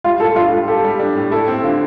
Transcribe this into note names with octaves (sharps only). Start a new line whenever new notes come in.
G3 F4
A2 A4
D4 F4
G3
G4 A4
G3
D4
A2
E4 A4
C4
D3 F4